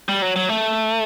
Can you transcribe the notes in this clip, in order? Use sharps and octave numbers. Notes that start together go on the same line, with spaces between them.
G3
F#3
F#3
A3